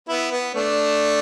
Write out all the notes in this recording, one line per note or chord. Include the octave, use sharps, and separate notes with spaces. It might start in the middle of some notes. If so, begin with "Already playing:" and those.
B3 E4
B3
A3 D4